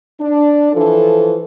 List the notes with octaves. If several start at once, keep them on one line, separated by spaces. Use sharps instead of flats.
D4
E3 F3 A4